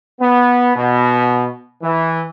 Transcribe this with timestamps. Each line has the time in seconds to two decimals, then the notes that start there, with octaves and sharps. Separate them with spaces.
0.20 B3
0.76 B2
1.83 E3